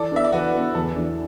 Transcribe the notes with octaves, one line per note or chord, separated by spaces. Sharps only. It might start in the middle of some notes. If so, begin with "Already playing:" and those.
Already playing: E3 A4 D5
B3 D4 E5
D5
E3 F#4 B4
B3 D4
E2 A4
E3 D4